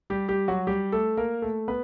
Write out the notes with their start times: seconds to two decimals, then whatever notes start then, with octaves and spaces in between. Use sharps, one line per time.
0.10 G3 G4
0.29 G3 G4
0.48 F#3 F#4
0.67 G3 G4
0.92 A3 A4
1.17 A#3 A#4
1.42 A3 A4
1.68 B3 B4